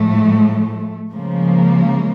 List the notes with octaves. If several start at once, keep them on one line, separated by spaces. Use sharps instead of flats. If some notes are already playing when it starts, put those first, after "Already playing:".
Already playing: A2 F3 G#3 A3
C#3 F3 G#3 A#3